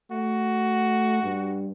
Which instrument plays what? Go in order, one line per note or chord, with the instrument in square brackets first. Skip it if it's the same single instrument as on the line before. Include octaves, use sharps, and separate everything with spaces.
[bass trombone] A3 [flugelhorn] F#4
[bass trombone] G2